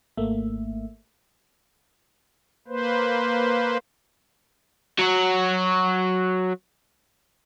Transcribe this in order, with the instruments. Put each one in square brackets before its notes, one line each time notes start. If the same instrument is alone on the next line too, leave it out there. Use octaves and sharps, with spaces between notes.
[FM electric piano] G#1 A3 A#3 E5
[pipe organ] A#3 B4 C5
[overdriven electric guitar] F#3 F#4